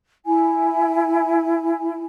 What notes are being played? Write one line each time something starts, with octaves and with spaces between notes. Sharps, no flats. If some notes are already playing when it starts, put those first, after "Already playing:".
E4 G#5